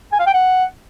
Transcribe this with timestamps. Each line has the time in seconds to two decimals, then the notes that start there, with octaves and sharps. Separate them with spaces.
0.12 G#5
0.19 F5
0.27 G5
0.34 F#5